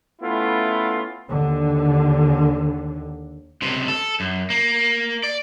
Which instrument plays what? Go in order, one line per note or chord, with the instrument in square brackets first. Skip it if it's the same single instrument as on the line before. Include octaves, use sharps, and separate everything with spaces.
[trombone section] A3 B3 C#4 E4 F4
[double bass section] D#2 D3
[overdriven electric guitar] C#2 C3
A4
F#2
A#3
D5